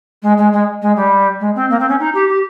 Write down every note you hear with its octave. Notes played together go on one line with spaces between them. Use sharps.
G#3
G#3
G#3
G#3
G3
G#3
C4
A#3
C4
C#4
D#4
G4
G4